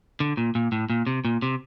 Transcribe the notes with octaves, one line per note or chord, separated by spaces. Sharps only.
D3
A#2
A#2
A2
A#2
C3
A#2
C3